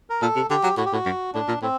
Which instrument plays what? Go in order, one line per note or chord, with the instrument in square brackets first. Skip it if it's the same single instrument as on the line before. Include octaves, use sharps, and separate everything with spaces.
[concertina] A#4
[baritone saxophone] A#2 [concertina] A4
[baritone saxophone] C3
[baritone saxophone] D3 [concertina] G4
[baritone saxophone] F#3
[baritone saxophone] A2 [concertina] F#4
[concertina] G4
[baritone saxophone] A2 [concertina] F#4
[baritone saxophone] F#2
[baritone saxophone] A2 [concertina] D4
[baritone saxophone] A#2
[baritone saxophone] A2 [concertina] C4